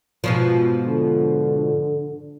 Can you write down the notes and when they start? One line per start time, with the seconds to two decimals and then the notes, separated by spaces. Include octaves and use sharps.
0.24 G#2 B2 F3
0.85 D3